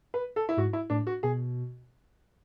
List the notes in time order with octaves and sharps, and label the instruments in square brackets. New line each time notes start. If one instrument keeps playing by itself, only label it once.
[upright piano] B4
A4
E4
[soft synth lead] G#2 [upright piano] F#4
[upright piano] E4
[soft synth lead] A2 [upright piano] D4
[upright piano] F#4
[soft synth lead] B2 [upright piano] G#4